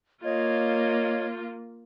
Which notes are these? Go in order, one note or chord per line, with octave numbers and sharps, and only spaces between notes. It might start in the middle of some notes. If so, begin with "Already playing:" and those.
A#3 F4 C#5 D#5 G#6